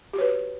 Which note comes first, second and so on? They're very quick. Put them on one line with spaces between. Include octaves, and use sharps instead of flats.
G4 F#4 C#5 B4